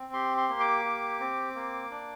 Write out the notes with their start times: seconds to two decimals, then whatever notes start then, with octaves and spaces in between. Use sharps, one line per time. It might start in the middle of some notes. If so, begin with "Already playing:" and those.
Already playing: C4
0.13 G4 C6
0.37 C6
0.49 A#3
0.60 D6
0.84 G4
1.20 C4
1.55 A#3
1.91 D4